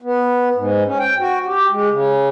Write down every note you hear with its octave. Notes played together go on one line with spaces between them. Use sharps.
B3
G#2
C#4
G5
F#4
G4
G#3
C#3